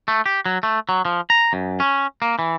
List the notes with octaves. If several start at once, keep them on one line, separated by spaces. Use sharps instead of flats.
A3
G4
F#3
A3
F#3
F3
A#5
F#2
C#4
A#3
E3